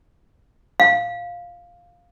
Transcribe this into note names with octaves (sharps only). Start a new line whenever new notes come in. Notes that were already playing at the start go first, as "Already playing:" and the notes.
F5